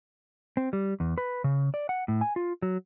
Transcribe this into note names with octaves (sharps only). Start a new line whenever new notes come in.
C4
G3
E2
B4
C#3
D5
F#5
A2
G#5
F4
F#3